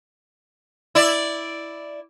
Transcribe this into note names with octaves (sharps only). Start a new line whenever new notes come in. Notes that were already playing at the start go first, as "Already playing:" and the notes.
E4 D5